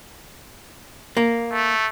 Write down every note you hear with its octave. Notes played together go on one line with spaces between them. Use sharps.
A#3
A3